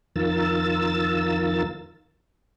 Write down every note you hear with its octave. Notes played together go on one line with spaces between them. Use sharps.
F2 D#3 F4 A#4 E6 A6